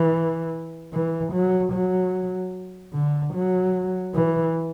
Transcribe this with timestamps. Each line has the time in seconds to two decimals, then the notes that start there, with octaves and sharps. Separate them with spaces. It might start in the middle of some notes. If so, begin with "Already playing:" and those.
Already playing: E3
0.93 E3
1.33 F#3
1.73 F#3
2.94 D3
3.34 F#3
4.14 E3